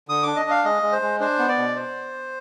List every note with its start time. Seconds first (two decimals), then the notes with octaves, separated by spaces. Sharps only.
0.08 D3 D#6
0.23 D4 D6
0.36 D#5
0.45 D4
0.51 F5
0.64 G#3 D#5
0.83 G#3
0.92 C5
1.02 G#3
1.20 D4 C5
1.39 B3
1.48 D5
1.58 B2
1.76 C5